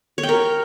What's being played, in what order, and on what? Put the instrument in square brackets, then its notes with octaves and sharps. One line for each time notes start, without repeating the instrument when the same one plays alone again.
[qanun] C#5
G5
A#4